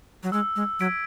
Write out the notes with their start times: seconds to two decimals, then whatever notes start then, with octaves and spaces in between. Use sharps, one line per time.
0.23 F#3
0.32 G#3 E6
0.56 G#3
0.80 F#3 G#6 B6 D7